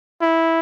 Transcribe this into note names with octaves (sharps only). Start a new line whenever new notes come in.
E4